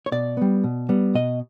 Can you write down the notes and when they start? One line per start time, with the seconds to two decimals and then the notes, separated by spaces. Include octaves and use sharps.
0.06 C#5
0.12 B2 D5
0.37 G3 B3
0.64 B2
0.89 G3 B3
1.15 B2 D#5